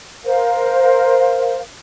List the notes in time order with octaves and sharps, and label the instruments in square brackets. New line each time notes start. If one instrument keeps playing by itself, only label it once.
[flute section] A#4 C5 F5